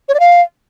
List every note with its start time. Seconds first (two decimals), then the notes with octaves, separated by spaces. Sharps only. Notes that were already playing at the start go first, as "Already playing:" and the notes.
0.09 C#5
0.14 D5
0.20 F5